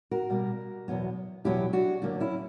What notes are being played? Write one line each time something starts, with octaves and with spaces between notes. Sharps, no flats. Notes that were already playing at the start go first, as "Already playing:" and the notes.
F#4 A#4
B2 G3 A#3
E2 B2 F#3 B3
E2 B2 F#3 B3 E4 G4
D4 F#4
D2 D3 F#3 A#3 D4
C#4 E4